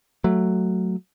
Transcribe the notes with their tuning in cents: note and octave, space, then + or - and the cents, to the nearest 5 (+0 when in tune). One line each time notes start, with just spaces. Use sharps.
F#3 +0 A3 +0